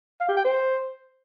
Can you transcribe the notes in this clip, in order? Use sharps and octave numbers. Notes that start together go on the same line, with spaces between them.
F5
G4
G5
C5